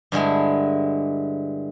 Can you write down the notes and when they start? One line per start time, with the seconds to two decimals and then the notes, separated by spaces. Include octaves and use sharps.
0.12 G2 D3 G#3 E4